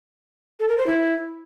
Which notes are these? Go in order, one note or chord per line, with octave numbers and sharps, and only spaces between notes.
A4
A#4
C5
E4